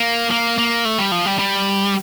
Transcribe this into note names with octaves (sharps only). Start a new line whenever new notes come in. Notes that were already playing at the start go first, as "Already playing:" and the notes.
Already playing: A#3
A#3
A#3
A3
G3
F3
G3
G3